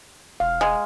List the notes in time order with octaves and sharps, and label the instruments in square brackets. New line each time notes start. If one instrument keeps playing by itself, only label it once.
[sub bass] E1 [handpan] F5
[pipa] G#3